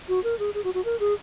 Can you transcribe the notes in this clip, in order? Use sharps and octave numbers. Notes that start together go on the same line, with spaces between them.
F#4
A#4
G#4
G#4
F#4
F#4
A#4
G#4